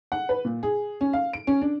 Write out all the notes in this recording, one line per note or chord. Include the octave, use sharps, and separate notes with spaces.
F#5
B4
A#2
G#4
C#4
F5
D7
C#4
D4